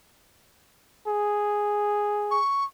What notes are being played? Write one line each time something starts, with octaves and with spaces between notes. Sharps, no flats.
G#4
C#6